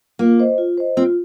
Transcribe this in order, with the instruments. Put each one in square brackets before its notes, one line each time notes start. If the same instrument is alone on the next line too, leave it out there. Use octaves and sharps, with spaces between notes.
[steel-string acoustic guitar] A#3 [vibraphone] F4
[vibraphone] C5 D#5
F4
C5 D#5
[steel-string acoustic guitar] C4 [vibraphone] F4